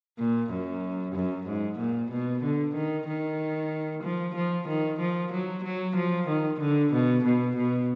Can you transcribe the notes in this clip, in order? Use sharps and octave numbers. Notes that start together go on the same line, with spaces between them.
A#2
F#2
F#2
G#2
A#2
B2
D3
D#3
D#3
F3
F3
D#3
F3
F#3
F#3
F3
D#3
D3
B2
B2
B2